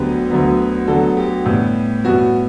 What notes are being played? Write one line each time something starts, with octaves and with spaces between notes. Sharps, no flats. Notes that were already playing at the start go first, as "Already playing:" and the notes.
Already playing: D2 D3 F#3 B3 G4 B4
D2 D3 F#3 B3
D2 D3 F#3 B3 F#4 A4
G4
A2 G3 B3
A2 G3 B3 F#4